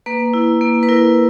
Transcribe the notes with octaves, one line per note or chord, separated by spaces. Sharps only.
A#3 B4
E4
A#3
B4
E4 A#4